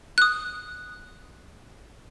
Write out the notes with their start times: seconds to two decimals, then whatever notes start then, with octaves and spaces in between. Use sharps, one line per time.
0.18 D#6 F#6